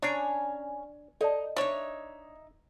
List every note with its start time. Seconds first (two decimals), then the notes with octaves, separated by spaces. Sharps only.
0.02 C#4 D4 C#5 G#5 A#5
1.21 D#4 A4 D5 D#5 A5
1.57 D4 D#4 C#5 E5